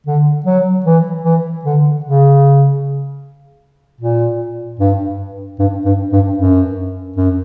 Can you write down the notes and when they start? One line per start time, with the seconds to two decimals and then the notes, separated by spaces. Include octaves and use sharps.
0.07 D3
0.46 F#3
0.86 E3
1.25 E3
1.65 D3
2.04 C#3
4.01 A#2
4.80 G2
5.59 G2
5.85 G2
6.12 G2
6.38 F#2
7.17 F#2